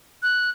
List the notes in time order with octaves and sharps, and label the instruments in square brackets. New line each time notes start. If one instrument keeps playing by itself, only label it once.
[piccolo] F#6